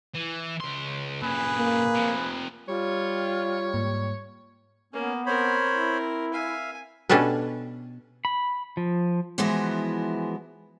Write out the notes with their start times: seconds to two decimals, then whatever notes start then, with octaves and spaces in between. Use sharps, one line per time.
0.15 E3
0.60 C#2 C6
1.22 A#2 C#3 G#4 B4
1.57 A#3
1.95 C3 F3
2.68 G3 F4 C#5
3.74 G#2 A#3
4.93 A#3 B3 C#4
5.26 C4 A#4 C5 C#5 B5
5.72 E4
6.34 E5 F5 G#5
7.10 B2 C#4 D4 G4 A4 B4
8.25 B5
8.77 F3
9.38 E3 F3 G#3 B3 E4 F#4